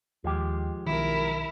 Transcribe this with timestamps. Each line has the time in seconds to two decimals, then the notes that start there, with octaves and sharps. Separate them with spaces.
0.24 D#2 F3 G#3 G4
0.86 B1 D#3 E4 A#4